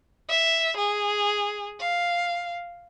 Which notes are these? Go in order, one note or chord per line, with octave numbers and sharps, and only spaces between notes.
E5
G#4
F5